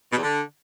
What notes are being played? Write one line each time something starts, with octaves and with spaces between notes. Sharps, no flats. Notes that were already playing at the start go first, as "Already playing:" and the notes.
B2
E2
D3